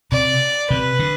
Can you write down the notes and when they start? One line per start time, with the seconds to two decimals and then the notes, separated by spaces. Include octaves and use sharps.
0.12 C3 D5
0.70 C3 B4
0.99 D3